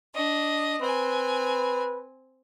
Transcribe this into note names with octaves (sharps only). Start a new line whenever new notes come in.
D4 D#5
C4 B4 G#5